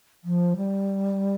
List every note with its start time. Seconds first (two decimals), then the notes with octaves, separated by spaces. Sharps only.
0.24 F3
0.57 G3